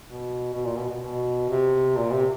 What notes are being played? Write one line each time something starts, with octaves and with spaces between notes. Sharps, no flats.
B2
B2
A#2
B2
B2
B2
C3
A#2
C3